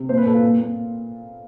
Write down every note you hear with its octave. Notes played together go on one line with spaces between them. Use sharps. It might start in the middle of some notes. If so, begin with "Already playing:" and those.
Already playing: C3
A#2 C5
B4
A#2 A4
F4
A#2
A#2